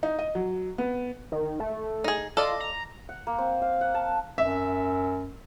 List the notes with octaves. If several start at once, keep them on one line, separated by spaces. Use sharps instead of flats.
D#4
D#5
F#3
B3
D#3
A3
D#4 G#4
F4 A4 D5 D#5
A#5
F#5
A#3
C4
F5
F#5
A5
F#2 E5